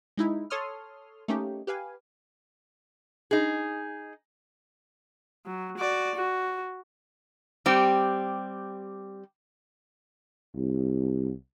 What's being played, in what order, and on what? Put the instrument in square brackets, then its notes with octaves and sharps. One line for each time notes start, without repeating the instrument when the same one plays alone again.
[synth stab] G#3 D#4 E4
A4 C#5 C6 D#6 F6
A3 A#3 C#4 D#4 G4
G4 B4 F5 G#5
[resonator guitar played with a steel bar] D#4 G#4
[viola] F#3
F#4 D5
F#4
[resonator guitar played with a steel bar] G3 C4 G4
[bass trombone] C2